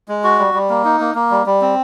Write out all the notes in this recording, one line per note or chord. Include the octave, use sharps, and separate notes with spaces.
G#3
F#4
G3
G3
A#3
D#4
A#3
A#3
G3
G3
C4